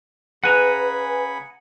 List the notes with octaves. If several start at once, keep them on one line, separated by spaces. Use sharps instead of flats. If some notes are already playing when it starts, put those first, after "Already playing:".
C#3 G#4 B4 F#5 G#5 A#5 B5 F#6